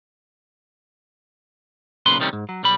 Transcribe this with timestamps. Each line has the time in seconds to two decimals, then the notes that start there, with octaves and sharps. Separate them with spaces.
2.06 B1 A#2 C#3 B4 C6
2.20 C3 D#3 G3 A3 C#4
2.33 G#2
2.49 F#3
2.63 B1 G3 B5